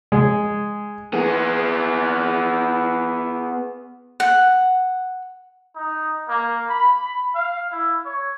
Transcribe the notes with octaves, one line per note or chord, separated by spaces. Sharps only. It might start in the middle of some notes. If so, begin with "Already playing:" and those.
G#3
B3 G#4
F#5
D#4
A#3
B5
F5
E4
C#5